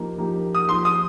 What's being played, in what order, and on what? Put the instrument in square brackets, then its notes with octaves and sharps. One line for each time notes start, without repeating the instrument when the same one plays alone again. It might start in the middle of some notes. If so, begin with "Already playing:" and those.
Already playing: [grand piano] F3 A#3 D#4 G4
F3 A#3 D#4 G4
[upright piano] D#6
[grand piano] F3 D#4 G4 [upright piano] C6
[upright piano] D#6